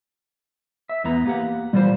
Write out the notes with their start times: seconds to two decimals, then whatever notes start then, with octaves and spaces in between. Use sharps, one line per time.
0.89 E5
1.04 E2 B3 A#5
1.26 A#3 G4 F#5
1.73 A#2 E3 G3 C5